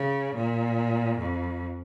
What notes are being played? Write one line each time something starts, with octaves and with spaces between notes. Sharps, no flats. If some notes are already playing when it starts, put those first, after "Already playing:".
Already playing: C#3
A#2
F2